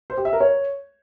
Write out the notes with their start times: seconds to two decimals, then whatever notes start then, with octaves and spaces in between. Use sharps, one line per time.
0.10 C5
0.17 G4
0.25 E5
0.33 A#4
0.40 C#5